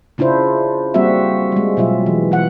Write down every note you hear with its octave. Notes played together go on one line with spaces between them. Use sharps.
C#3 D4 E4 F4 C5
G3 A#3 C4 F#4 E5
G3 G#3
B2 F#3 F4 E5
E3
E3 F#5